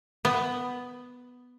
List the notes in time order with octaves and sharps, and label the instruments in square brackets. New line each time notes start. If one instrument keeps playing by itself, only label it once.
[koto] B3